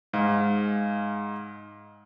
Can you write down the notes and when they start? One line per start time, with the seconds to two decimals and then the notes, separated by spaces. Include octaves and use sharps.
0.13 G#2 G#3 F5